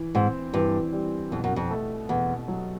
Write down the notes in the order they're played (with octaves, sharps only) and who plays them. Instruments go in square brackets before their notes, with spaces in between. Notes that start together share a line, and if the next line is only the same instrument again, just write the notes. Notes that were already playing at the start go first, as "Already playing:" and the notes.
Already playing: [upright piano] E3
[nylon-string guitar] G#2 [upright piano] C4
[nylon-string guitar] G2 [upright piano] E3
[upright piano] G3
[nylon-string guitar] F2 [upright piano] B2
[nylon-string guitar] F#2
F2
[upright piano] A3
[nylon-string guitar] E2 [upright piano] B2
[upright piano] F#3